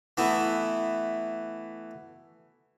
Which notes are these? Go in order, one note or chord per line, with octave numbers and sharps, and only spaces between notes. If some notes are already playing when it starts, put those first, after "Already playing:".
E3 A3 B3 E4